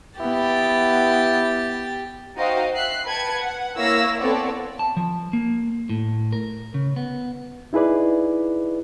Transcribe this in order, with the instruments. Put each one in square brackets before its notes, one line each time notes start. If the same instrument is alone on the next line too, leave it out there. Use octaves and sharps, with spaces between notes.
[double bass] B3 [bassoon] E4 [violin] G4 A6
[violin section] D#4 F#4 C5 D#5 F5 G5
E5 F#6 C7
B4 G5 A5 G#6 C#7
F#5
A#3 E4 C#5 F5 E6 A#6
B3 C4 A4 C#5 D5 F#5
[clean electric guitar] A5
F3
A#3
A2
A#4
C#3
B3
[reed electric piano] D#4 E4 G#4 B4 D5